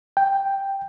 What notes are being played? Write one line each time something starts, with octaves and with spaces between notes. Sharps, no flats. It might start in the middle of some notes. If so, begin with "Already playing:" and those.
G5